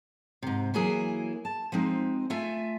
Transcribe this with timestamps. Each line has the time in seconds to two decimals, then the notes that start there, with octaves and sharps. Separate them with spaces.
0.42 G#2 C3
0.74 E3 F#3 A#3 E4 G#4
1.45 A5
1.72 F3 G#3 C4 D#4
2.30 A3 F4 E5 G#5